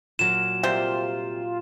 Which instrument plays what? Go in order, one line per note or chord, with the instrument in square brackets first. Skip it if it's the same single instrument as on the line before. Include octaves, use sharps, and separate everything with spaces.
[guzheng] A#2 F#3 A#4 [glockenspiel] E7
[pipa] C3 G3 C5 [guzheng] A#3 G4 [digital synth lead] F4